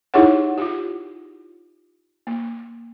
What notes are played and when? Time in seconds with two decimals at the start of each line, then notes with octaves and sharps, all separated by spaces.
0.14 D#4 E4 G4 G#4 C#5 F#5
0.58 F4 G4
2.27 A#3